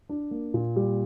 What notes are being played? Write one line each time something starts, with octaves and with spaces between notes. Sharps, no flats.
D4
A#3
A#2
G3